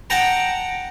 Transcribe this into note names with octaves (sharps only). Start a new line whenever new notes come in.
F#5 G5 A5 A#5